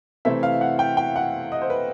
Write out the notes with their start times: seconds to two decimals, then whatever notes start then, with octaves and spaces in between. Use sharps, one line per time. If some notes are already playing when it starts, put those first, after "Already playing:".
0.25 C3 E3 A3 C4 E4 E5
0.43 F5
0.61 F#5
0.79 G5
0.97 G5
1.16 F#5
1.52 D#5
1.62 C5
1.70 B4